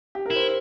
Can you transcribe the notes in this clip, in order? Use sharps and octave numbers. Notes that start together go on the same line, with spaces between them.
G4
A#4
E4
C5